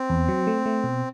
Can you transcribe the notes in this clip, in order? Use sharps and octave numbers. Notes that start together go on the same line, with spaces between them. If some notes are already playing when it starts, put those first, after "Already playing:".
Already playing: C4
E2
F#3
A3
A3
B2